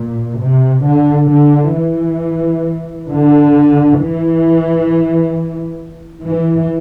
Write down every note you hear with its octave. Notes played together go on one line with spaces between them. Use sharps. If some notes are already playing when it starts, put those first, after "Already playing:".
Already playing: A#2
C3
D3
D3
E3
D3
E3
E3